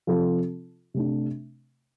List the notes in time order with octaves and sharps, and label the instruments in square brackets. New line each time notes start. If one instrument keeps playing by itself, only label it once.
[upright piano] C3 F3 C4 F4 A4
C3 A3 D4